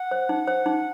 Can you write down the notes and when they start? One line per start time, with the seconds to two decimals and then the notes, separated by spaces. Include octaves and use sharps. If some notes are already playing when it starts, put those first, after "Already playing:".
Already playing: F#5
0.11 C5
0.29 D#4
0.48 C5
0.66 D#4